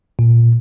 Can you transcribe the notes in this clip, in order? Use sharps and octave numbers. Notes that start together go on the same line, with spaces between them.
A#2